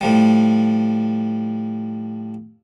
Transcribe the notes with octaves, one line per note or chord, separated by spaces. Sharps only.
A2 F3 G3